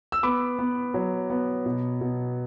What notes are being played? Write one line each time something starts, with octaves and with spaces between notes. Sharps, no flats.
E6
B3 B5 D6
B3
F#3
B3
B2
B2